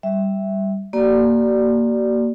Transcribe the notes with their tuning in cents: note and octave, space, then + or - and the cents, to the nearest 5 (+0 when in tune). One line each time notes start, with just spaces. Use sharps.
G3 +0 E5 +0
A#3 +0 G4 -45 D5 +0